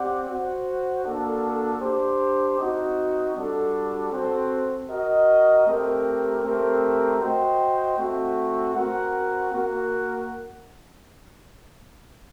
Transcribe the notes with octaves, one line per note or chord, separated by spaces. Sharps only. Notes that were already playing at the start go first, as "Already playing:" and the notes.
Already playing: C4 G4 D5 F#5
F#4 C5 F#5
A#3 D4 F#4 A4
D4 G4 C5
C4 D#4 F#4
G3 D4 F#4 A4
C4 F#4 A4 C5 G5
F#4 A#4 D#5
A3 C4 G4 A#4
A3 C4 G4 A#4
F#4 C5 D#5 G5
A3 C4 F#4
C4 F#4 A#4 F#5
A#3 F#4 A#4 F#5